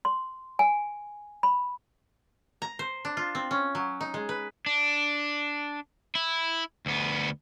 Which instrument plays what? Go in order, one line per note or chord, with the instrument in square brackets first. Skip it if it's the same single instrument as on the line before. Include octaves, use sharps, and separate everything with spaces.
[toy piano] C6
G#5
B5
[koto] A#5
C5
D4
F4
C4
C#4
F#3
D#4
G#3
B4
[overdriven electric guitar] D4
E4
D2 B3